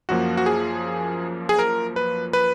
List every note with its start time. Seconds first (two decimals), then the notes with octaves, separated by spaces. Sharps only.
0.09 F#2 F3 A#3 F#4
0.37 F#4
0.46 G#4
1.49 G#4
1.59 A#4
1.96 B4
2.33 B4